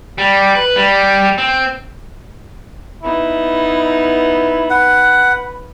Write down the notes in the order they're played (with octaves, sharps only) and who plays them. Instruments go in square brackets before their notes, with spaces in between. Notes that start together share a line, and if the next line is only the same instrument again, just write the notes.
[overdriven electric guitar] G3
B4
G3
C4
[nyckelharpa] B3 D#4 [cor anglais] E4
[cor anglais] B4 [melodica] F#5